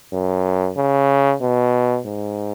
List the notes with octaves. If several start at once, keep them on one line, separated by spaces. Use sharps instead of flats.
F#2
C#3
B2
G#2